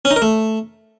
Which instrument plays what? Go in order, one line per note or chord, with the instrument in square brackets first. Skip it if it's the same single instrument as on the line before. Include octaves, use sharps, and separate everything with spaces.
[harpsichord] C#4
D#4
A#4
A3